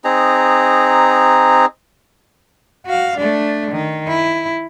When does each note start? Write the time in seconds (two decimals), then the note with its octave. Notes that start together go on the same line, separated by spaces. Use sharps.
0.04 C4 D#4 G#4 A#5
2.86 F#4 F5
3.17 A3 D4
3.71 D#3
4.08 E4